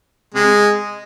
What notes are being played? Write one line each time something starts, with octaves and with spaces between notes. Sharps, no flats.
C3 G#3